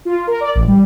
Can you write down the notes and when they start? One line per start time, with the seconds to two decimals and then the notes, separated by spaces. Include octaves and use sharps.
0.05 F4
0.27 A#4
0.40 D5
0.55 A1
0.67 G3